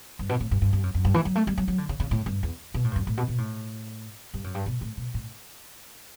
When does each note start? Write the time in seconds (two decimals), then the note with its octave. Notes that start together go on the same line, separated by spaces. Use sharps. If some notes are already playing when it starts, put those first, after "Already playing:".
0.19 G2
0.29 B2
0.40 A2
0.51 G2
0.62 G2
0.73 G2
0.83 F#2
0.95 F#2
1.05 G2
1.14 E3
1.25 F#3
1.36 A3
1.47 G3
1.58 F#3
1.68 F#3
1.78 D3
1.89 C#3
2.00 C#3
2.11 A2
2.26 G2
2.43 E2
2.74 B2
2.84 A2
2.91 G2
2.96 F#2
3.07 A2
3.17 B2
3.28 B2
3.38 A2
4.34 G2
4.44 F#2
4.55 G2
4.66 B2
4.81 A2
4.97 B2
5.14 A2